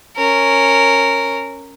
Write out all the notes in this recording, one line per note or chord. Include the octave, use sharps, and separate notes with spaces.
C#4 A#4